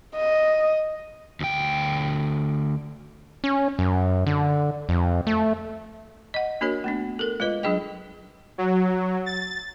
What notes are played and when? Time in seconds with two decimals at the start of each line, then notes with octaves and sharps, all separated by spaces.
0.16 D#5
1.40 D2 G5
3.44 C#4
3.79 F#2
4.27 D3
4.89 F2
5.27 A3
6.34 D#5 F#5
6.61 A#3 D4 F#4 A#4 C#5
6.84 A3 B3 D4
7.19 A4 A#4
7.40 G#3 F4 B4 D#5
7.63 F#3 D4 G#4 D#5 G5
8.58 F#3
9.26 A6